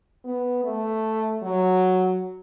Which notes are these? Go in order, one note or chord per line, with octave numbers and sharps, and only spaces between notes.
B3
A3
F#3